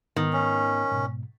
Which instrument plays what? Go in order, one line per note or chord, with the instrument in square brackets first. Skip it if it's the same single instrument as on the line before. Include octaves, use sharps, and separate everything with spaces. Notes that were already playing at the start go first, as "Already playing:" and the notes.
[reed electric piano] G#2 B3 D#4 [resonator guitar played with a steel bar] D#3
[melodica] C#4
[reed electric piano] G#2 B2